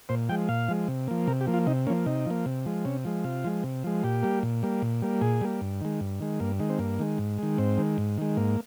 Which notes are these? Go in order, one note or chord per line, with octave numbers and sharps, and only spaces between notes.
A#2 C5
F3 G#3 G5
A#2 F5
F3 G#3
C3
F3 A#3
C3 A#4
G4
F3 A#3
F4
C3 D#4
F3 A#3 C#4
C3 D#4
F3 A#3
C3
F3 G#3
C3 C#4
F3 G#3
C3 F4
F3 G#3
C3
F3 G#3
A#2 G4
G3 A#3
A#2
G3 A#3
A#2
G3 A#3
A#2 G#4
G3 A#3
G2
D#3 G#3
G2
D#3 G#3
G2 A#3
D#3 G#3
C4
G2 A#3
D#3 G#3
G#2
D#3 G#3
G#2 C4
D#3 G#3
G#2
D#3 G#3
G#2 A#3